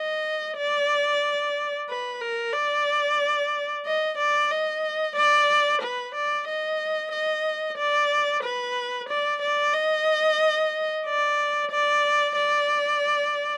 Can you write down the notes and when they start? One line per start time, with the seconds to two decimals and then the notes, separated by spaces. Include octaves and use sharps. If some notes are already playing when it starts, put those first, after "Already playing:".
Already playing: D#5
0.58 D5
1.89 B4
2.21 A#4
2.53 D5
3.86 D#5
4.18 D5
4.51 D#5
5.16 D5
5.82 B4
6.15 D5
6.48 D#5
7.12 D#5
7.78 D5
8.43 B4
9.09 D5
9.42 D5
9.74 D#5
11.06 D5
11.71 D5
12.36 D5